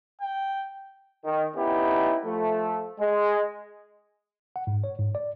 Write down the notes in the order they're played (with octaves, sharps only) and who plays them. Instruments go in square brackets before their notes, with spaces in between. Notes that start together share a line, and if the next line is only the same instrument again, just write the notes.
[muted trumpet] G5
[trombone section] D#3
B3 C#4 D#4 E4 G4
F3 A3
G#3
[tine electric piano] F#5
G#2
C#5
G#2
D5